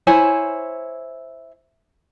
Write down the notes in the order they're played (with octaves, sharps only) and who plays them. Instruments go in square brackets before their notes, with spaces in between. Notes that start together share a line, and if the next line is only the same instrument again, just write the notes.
[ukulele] E4 C5 C#5 G#5